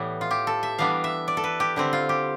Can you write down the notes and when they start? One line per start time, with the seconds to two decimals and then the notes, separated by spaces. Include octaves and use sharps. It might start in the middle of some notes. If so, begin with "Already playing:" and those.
Already playing: A2 E3 G3 B3
0.21 F4
0.31 G4
0.47 A4
0.63 E5
0.78 E3 G3 B3 D4 F5
1.04 E5
1.28 D5
1.37 A4
1.44 B4
1.60 G4
1.76 D3 G3 C4 E4
1.93 F4
2.09 G4